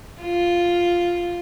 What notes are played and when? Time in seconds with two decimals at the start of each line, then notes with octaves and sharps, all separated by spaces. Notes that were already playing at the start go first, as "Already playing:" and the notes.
0.22 F4